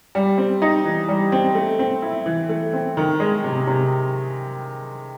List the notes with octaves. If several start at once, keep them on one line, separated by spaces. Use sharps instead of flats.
G3
C4
D#4
E3
G3
C4
A3
C4
E4
E3
A3
C4
D#3
G#3
C3
C3